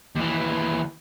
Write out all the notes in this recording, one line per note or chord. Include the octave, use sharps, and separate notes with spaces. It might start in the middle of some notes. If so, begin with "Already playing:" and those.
D#2 E3